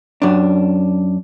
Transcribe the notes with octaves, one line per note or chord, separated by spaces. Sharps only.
F#2 D4